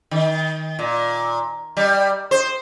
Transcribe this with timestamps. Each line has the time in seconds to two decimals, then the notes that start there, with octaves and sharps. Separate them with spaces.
0.11 D#3
0.79 A#2
1.77 G3
2.31 C5